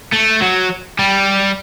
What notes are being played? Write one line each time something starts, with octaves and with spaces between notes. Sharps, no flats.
A3
F#3
G3